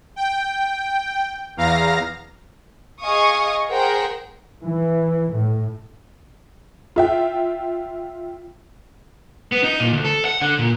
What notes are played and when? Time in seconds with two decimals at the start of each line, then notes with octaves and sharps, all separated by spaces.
0.16 G5
1.57 E2 F5 A#5 A#6
3.02 G#4 D#5 F5 G#5 C#6 D#6
3.68 G#4 A#4 C5 F#5 G5
4.63 E3
5.32 A2
6.96 F4 E5 G5
9.52 B3
9.64 D#4
9.80 A#2
9.93 D2
10.05 A4
10.25 F#5
10.42 D3
10.59 A#2